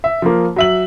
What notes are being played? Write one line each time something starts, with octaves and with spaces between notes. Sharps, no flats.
E5
F3 A#3
F#3 E5 F#7